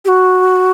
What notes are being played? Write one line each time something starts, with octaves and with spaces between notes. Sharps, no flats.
G4
F#4